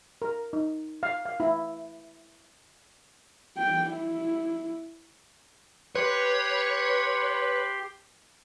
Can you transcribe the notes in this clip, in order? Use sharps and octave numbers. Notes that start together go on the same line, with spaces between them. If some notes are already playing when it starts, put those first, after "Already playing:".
A#4
D#4
F5
F5
E4
G5
E4
G4 B4 C#5 C6